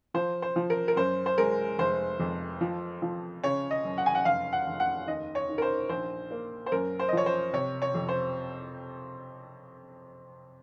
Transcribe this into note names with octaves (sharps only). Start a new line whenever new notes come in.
F3 C5
C5
F3
A#4
A#4
F#2 C5
C5
G#3 A#4
F1 C5
F2
F3
F3
C#3 C#5
D#5
F#2
F#5
G#5
F#5
F1 F5
F#5
F1
F#5
D#2 D#5
C#5
D#3
A#4
C5
A#1 C5
A#3
C5
F#2 A#4
C5
D#5
F3 C#5
C5
C3 C#5
C#5
F2
C5